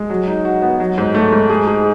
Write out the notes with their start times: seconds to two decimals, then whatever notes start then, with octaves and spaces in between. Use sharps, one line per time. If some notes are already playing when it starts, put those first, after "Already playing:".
Already playing: G#3
0.10 F#3
0.27 D#4
0.45 F#4
0.62 B3
0.80 F#3
0.98 G#2
1.15 A3
1.32 G#2
1.50 G#4
1.67 G#4